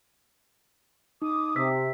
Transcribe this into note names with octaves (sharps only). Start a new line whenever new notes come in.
D#4 D6 D#6
C3 C5 E6 B6